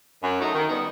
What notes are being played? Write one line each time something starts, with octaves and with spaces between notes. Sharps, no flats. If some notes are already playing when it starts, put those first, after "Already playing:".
F#2
F#3 A3 D#4
D#3
G3 B3 D#4